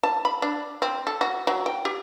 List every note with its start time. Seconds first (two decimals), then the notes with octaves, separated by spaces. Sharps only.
0.03 A5
0.25 B5
0.42 D4
0.82 C4
1.07 A4
1.21 F#4
1.47 F#3
1.66 G5
1.85 G4